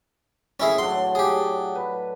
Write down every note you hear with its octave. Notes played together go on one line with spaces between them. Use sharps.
A2 D#3 C#4 E4 G#4
F#3 D4 C6
G4 G#4
B4